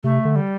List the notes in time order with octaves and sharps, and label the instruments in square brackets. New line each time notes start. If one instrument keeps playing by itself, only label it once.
[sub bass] C3 [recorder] A3
[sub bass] D3
[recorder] G3